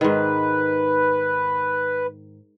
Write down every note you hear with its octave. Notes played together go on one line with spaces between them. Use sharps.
G#2 D#3 B4